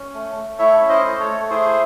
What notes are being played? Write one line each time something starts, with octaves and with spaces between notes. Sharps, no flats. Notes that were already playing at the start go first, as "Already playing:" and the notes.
Already playing: C#4
A3
A3
E4 C#5 E5
C#4
C5 D#5
A3
A4 C#5
A3
E4 G#4 C5